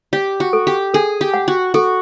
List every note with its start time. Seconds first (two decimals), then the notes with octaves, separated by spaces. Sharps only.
0.13 G4 D5
0.40 F#4
0.53 A4
0.67 G4
0.94 G#4 A4
1.21 G4
1.34 F#5
1.48 F#4
1.74 F#4 A4